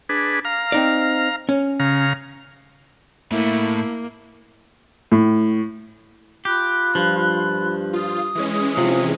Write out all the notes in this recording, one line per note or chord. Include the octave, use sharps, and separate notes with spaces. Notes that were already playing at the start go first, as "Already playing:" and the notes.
D4 G#4 B4
F5 A#5
C4 D#4 D5
C#4
C#3 F5 A#5
A2 A3 A#3 E4
A2
F4 G4 B5 F#6
G2 F3
F4 D#6
E3 G#3 C#4
C3 F3